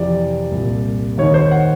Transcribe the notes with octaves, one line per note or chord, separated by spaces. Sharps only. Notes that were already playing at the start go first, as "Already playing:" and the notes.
Already playing: F2 C3 E3 D5
C2 A#2
D#2 D#3 C#5
C5
F#5